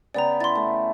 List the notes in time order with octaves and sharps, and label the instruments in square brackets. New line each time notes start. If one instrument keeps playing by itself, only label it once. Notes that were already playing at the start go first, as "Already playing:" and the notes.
[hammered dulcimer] C#3 B3 G5 [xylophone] D5 A#5
[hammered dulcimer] E4 [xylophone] C6 A6
[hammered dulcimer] A3